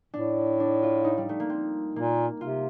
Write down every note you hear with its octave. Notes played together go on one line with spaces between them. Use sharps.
A2 D4
D4
F4
D#4
G3
A3
A#3
C4
A#2 A#3
C3 F4